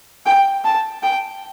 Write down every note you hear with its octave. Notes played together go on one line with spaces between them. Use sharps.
G5
A5
G5